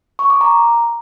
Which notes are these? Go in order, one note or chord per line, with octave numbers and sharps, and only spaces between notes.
C#6
D6
A#5